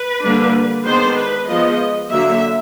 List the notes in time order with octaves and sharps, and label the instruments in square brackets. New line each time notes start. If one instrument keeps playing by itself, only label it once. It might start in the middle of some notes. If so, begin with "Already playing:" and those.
Already playing: [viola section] B4
D3 G3 A#3 D4
D#3 G#3 B3 D4 C5
B4
F3 G#3 B3 D#5
D3 F#3 A#3 E5